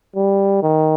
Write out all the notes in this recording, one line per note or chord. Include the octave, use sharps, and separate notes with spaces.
G3
D#3